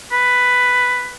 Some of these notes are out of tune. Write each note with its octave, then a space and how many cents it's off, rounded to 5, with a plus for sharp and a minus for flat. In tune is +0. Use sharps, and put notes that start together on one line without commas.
B4 +5